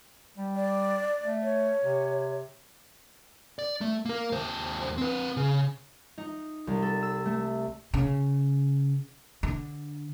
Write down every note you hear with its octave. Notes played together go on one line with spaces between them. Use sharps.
G3
D5
A3
C#5
C3
D5
A3
A#3 A#4
D#2 C5
C4 B4
C#3
D#4
C2
A4
E6
A3
C#3
D3